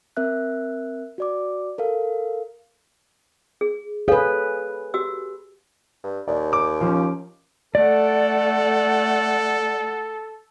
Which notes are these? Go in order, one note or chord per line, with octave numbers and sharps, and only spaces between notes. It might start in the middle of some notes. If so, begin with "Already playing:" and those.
C4 A#4 E5 F#6
F#4 D5 D6
A4 A#4 F5
G#4
G#4 A4 B4 C#5 F5
F#4 G4 E6
G2
D#2 D5
D6
F3 C#4
A3 A4 D5 F#5